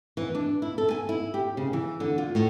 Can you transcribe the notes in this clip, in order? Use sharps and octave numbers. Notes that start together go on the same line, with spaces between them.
E3
D4
E4
A4
G#5
E4
G4
C#3
E3
D3
F4
A2